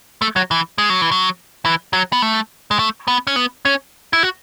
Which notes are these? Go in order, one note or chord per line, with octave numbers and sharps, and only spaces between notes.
A3
F#3
E3
G#3
F#3
E3
F#3
E3
F#3
B3
A3
G#3
A3
B3
C#4
B3
C#4
E4
F#4